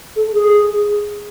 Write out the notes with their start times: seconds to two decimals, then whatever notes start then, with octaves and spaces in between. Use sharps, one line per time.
0.16 A4
0.32 G#4